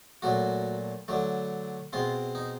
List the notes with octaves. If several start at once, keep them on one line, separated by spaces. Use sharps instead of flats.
A#2 F#3 A3 F#4
D3 F#3 A3
B2 G#3 C4 F4
D#4